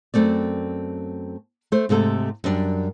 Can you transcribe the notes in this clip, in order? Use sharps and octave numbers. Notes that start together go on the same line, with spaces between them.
F#2 D#3 A3 C4 D5
A3 C5
G#2 C3 A3 A4
F#2 G3 D4